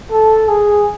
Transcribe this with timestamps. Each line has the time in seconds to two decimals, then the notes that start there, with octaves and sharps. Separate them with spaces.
0.12 A4
0.49 G#4